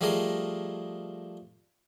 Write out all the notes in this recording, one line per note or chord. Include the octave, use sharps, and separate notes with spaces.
F3 G3 A3 G#4 A#4 D#5